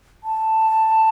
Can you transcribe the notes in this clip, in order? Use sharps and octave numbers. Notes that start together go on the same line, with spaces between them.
A5